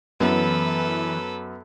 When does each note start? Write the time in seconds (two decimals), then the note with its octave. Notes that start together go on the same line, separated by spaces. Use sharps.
0.20 F#2 E3 B3 A4 B4